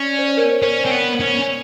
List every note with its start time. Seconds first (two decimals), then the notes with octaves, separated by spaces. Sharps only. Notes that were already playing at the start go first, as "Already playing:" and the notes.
Already playing: C#4 D5
0.19 C5
0.28 C#5
0.37 A#4 C5
0.52 C#5
0.62 C#4 A#4 C5
0.85 C4
0.91 B3
1.20 C#4